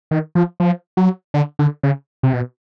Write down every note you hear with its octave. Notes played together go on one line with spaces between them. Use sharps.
D#3
F3
F3
F#3
D3
D3
C#3
C3
B2